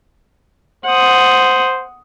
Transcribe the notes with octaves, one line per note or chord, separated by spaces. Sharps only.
C5 F#5 D#6